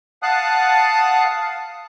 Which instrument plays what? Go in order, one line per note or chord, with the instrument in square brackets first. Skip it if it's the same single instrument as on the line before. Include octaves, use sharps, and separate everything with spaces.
[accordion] F5 F#5 A5 D#6 F#6